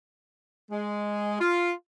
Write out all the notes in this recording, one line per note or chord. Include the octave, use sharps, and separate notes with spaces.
G#3
F4